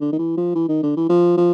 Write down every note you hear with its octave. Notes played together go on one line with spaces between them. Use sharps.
D3
D#3
E3
F3
E3
D#3
D3
E3
F3
F3